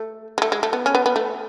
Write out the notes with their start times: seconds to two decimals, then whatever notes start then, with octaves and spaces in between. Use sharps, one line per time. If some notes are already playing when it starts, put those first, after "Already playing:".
Already playing: A3
0.38 G#3
0.42 A3
0.52 G#3
0.63 A3
0.73 B3
0.86 C#4
0.95 B3
1.06 B3
1.16 A3